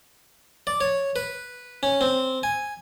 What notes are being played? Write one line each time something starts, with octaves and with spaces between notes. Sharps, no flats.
D5
C#5
B4
C#4
C4
G#5